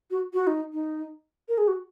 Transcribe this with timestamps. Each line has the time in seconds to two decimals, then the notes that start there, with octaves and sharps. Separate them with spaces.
0.11 F#4
0.34 F#4
0.47 D#4
0.73 D#4
1.49 A#4
1.58 G#4
1.68 F#4